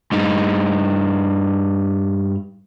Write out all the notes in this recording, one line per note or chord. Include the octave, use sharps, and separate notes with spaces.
G2 D#4